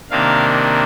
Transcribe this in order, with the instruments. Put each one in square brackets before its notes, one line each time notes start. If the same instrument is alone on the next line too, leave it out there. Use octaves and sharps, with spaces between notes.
[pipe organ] C3 D#3 A#3 D4 F5